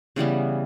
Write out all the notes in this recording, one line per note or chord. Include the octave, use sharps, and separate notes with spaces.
C#3 E3 G3 B3